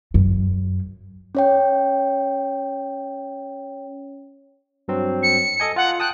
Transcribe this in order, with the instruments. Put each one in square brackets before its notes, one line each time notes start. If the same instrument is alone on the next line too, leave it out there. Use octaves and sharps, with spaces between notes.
[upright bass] F#2
[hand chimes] C#4 C#5 G5
[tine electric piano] G2 F#3 C4
[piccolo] C#7
[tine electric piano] A4 D#5 G#5
[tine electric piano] F4 [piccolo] F#5
[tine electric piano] G5 A5 D#6 [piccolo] F#6